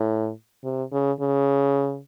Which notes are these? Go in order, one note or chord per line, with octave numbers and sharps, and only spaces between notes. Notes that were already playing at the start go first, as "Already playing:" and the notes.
Already playing: A2
C3
C#3
C#3